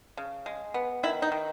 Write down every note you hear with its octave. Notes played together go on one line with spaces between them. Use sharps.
C#3
G#3
B3
D#3 E4
D#4
D#3